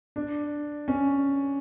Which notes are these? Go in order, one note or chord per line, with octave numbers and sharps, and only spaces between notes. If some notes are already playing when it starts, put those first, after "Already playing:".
D4
C#4